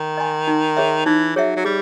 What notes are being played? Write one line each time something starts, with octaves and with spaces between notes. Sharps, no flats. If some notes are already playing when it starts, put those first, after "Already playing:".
Already playing: D#3
D#5 G#5 C6
D#4
G#4 C#5 E5
E3 D#4
F#3 G#4 C#5 E5
F#3
G3 G#4